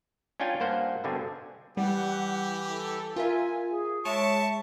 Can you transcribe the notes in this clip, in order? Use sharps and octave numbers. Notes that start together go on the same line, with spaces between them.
C#4 D4 F4 G5 G#5
G2 A#3 C5 F#5
G2 B2 D3 C4 D4 G#5
E3 G3 G4 F#5
A4
F4 A#4 E5 G#5
G#4
G#3 C#5 E5 A5 C#6 D7